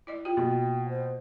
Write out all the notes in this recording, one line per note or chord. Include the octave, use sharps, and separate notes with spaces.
E4 D5 D#5
F4 G4 G5
B2 A#3
C5